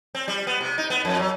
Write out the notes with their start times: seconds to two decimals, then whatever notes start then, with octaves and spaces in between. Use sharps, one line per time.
0.15 C4
0.28 G3
0.47 B3
0.61 C3
0.78 D#4
0.90 B3
1.05 F2
1.19 F#3